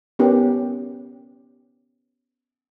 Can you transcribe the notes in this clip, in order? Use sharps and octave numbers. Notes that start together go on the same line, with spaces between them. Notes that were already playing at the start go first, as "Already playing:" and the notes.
B3 C#4 D#4 G4 A#4 B4